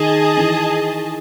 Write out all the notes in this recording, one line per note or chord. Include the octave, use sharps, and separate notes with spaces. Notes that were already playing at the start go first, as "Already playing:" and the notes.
Already playing: D#3 G#4 D#5 A5
E3